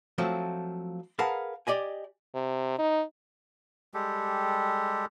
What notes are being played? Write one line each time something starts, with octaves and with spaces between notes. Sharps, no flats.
F3 F#3 A3 C4
G#4 A#4 B4 F5 F#5 A5
G4 D5 D#5 G#5
C3
D#4
G3 G#3 G4 A4